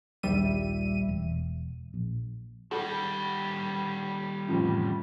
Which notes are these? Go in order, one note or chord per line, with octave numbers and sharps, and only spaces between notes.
A#1 D#2 G3 E5 D#7
E1
A#1
D#3 G3 A4 F#5
A1 F2 C#3